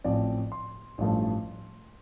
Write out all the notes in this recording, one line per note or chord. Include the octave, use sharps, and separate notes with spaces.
A1 A2 F3 C4 D5
C6
A1 G2 F3 A3